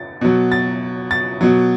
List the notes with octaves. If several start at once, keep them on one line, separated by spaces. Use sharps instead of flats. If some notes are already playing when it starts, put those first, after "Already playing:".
Already playing: A6
B2 F#3
A6
A6
B2 F#3